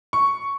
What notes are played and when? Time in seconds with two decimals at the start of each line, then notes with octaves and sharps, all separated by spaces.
0.13 C#6